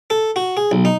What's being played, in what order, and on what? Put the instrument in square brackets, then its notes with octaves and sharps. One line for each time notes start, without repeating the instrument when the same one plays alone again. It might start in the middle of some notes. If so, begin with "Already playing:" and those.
[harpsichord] A4
F#4
G#4
B1
D#4